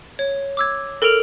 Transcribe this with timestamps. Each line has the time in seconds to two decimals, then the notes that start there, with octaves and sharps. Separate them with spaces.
0.19 C#5
0.57 D6 E6 G#6
1.02 A4 A#4 F6 D7 F7 F#7